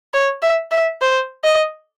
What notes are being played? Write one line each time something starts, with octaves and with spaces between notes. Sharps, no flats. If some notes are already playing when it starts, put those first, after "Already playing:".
C#5
E5
E5
C5
D#5